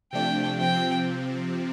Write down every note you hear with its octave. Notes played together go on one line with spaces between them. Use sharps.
C3 F3 A3 D4 G5
C3 F3 C4 G5